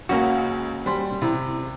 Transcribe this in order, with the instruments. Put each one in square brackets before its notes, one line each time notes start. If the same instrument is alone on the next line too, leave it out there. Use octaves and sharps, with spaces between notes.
[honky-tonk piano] C#2 [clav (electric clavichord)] A#3 C#4 F#4
[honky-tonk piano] G3 [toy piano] C5 G#5 C6
[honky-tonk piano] C3 [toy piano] E4 B5